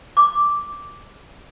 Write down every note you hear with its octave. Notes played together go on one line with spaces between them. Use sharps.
D6